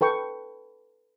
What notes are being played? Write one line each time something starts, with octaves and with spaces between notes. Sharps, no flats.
A4 B4 G5 C#6